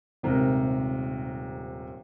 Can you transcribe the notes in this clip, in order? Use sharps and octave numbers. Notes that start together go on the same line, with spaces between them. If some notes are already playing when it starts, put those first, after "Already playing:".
D#1 G#2 C3 A#4